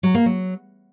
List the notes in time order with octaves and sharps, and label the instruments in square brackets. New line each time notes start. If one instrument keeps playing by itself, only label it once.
[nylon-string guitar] F#3
A#3
F#3